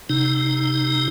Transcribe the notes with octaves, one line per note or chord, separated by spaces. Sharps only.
C3 D#4